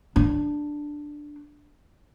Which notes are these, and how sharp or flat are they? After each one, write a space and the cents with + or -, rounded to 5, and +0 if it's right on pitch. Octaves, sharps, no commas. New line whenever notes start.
D4 +5